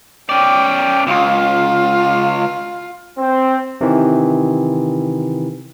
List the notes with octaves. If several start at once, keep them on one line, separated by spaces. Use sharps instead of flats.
C#4 D5 G5
C#2 F4
C4
C3 D#3 E3